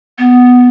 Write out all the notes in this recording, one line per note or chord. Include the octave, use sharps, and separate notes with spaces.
B3